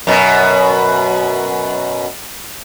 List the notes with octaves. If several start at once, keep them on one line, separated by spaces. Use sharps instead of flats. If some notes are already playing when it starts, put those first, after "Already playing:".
F#2 B2